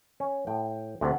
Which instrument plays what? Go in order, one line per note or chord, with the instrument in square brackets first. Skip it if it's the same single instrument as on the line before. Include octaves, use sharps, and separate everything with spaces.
[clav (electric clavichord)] C#4
[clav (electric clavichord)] A2 [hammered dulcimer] G5
[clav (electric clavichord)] D2 C3 [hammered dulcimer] C5 F#5